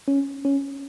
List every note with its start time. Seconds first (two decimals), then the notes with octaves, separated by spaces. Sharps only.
0.08 C#4
0.45 C#4